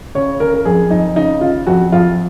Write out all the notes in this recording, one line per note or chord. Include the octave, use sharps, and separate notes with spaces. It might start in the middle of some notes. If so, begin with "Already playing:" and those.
C#3 C#5
C#3 A#4
A#4
F2 G#4
F2 D#4
C#3 D#4
C#3 F4
F2 F#4
F2 F4